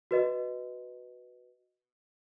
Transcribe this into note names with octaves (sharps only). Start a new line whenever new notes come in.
F#4 B4 D#5